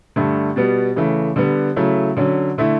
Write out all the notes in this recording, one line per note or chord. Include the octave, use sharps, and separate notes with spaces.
G2 D3 A3
B2 G3 B3
C#3 E3 A3
D3 G3 B3
C#3 F#3 A3 E4
D3 F#3 C#4
D3 A3 E4